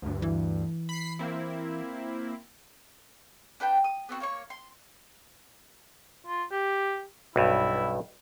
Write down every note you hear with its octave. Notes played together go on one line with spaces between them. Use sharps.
D2 G2
E3
B5 B6 C7
A#3 C4 E4
D4 B4 G5 G6
D#6
B3 C4 F#4
A#3 C#5 C#6
C6
F4
G4
B1 G2 E4